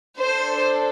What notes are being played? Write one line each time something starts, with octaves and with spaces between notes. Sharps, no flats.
D4 A4 C5